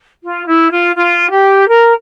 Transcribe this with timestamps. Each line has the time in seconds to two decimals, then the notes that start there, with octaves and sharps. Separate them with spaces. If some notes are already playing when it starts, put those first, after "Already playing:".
0.23 F4
0.47 E4
0.71 F4
0.95 F4
1.31 G4
1.68 A#4